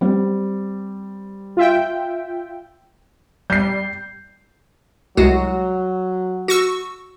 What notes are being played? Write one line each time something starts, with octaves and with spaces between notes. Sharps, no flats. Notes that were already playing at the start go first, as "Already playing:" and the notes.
G3 C4
F4 E5 G5
G3 G6 C7
C2 F#3 G#3 F#4
F#4 C#6 E6